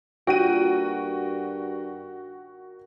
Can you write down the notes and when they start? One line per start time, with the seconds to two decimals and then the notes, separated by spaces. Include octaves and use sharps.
0.27 G2 A#2 D#3 F#4 G5 D#7